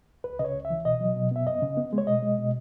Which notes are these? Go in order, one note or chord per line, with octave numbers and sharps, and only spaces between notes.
C#2 B4
C#3 D#5
C#5
C#2
E5
E3
B2 D#5
F#3
B2
B3 E5
F#2 D#5
C#3
B3
G#3
C#5
B2 D#5
G#3
B2